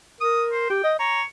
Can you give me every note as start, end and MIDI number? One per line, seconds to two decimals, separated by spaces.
0.21 0.65 70
0.21 0.44 87
0.52 0.68 72
0.70 0.83 67
0.70 0.90 79
0.84 0.95 75
0.99 1.22 73
0.99 1.22 82